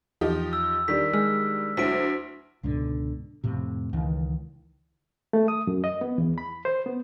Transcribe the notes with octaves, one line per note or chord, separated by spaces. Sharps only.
E2 F3 D#4 G4
E6
D#3 G3 D4 B6
G#3 E6 F6
D2 F#3 E4 B6 D7
C#2 G#2 B2 D3
F2 A2 C3
C#2 D#3 E3
A3
D#6
F#2
D#5
B3
E2
B5
C5
B3